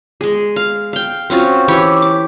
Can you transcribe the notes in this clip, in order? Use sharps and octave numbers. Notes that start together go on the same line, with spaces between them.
G#3 G#4
F5
F5 G5
C4 C#4 F4 F#4
E3 E4 G4 C#5
D6